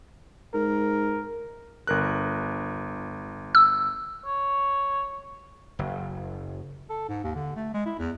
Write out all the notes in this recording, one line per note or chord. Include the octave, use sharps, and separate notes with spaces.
G#2 A#4
G1 A#4 F#6
E6
C#5
F#1
A4
G#2
D#2
D3
A3
G#3
E4
E2